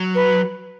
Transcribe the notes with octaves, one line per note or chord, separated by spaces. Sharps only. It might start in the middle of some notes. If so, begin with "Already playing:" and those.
Already playing: F#3
B4